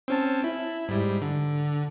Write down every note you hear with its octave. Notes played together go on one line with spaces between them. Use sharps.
C4 C#4 A5
E4
G#2 G3
D3